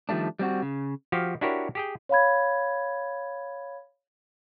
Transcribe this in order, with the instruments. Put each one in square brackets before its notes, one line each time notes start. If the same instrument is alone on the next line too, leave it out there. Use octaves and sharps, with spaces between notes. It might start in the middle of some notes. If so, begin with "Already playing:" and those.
[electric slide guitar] D#3 F3 G3 A3 D4
G3 C4 F#4
C#3
[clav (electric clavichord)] F3 F#4 G4 F5
D4 E4 F#4 G4 A#4 C#5
G4 G#4 G5
[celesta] C#5 F5 B5 G#6